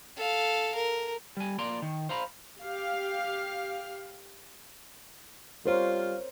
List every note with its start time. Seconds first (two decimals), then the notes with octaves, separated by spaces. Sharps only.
0.17 A4 F5
0.75 A#4
1.37 G3 G#5
1.58 F3 A#3 D5 A#5 C6
1.82 D#3
2.09 C5 F5 A#5 B5
2.60 G4 F5
5.66 G3 F4 A#4 C5 C#5